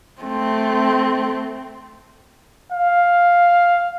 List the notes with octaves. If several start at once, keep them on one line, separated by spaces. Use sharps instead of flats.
A3 C4
F5